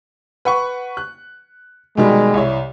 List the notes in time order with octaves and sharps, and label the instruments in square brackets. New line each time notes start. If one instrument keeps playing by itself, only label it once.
[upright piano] B4 F#5 C#6
F#6
[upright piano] B2 D#3 G3 [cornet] G#3
[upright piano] C2 E4 C#5